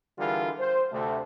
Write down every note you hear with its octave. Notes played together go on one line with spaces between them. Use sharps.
D3 E3 G3 F4 G#4 A#4
C5
D2 C3 A3